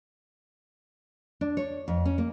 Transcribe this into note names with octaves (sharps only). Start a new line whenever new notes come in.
D4
C#5
F2
C#4
A#3